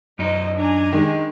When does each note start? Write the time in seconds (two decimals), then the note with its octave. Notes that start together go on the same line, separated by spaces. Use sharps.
0.19 F#2 D#4 C5 D#5
0.58 D4 G#5 A#5
0.93 D#3 G#3